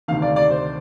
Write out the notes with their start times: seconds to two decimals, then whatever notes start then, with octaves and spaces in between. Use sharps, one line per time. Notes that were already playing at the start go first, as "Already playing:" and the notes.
0.08 D2 C3 D#3 F5
0.22 D5
0.36 D5
0.50 C5